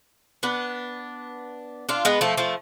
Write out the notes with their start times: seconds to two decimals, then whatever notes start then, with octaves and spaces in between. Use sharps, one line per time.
0.43 B3 D4
1.89 D4 F4
2.05 G#3 B3
2.21 F3 A3
2.37 F3 A3